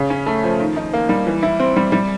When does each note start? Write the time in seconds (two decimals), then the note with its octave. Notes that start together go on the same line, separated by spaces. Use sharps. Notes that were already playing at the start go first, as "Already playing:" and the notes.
Already playing: C#3
0.10 C#4
0.26 A3
0.43 F3
0.60 D#3
0.76 D#4
0.93 A#3
1.09 G3
1.27 E3
1.43 E4
1.60 C4
1.76 G3
1.92 G3